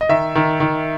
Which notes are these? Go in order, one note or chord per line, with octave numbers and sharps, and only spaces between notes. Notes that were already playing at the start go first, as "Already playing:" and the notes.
D#5
D#3 E5
D#3
D#3